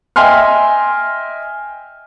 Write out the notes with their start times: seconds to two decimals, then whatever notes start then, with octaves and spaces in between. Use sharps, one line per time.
0.16 D#5 E5 G5 G#5 C6 F6